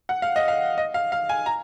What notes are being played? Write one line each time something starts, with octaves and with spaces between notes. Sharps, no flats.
F#5
F5
D#5
F5
D#5
F5
F5
G#5
A#5